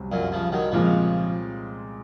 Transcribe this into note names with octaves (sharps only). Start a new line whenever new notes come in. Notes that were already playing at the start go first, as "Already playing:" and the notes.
Already playing: C2 C3 F#3
F#2 A#2
C#3 F3
D#3 F#3
A#2 C#3 F3 G#3 C4